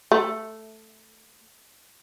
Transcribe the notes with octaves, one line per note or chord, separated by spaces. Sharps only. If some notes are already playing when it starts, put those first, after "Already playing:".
A3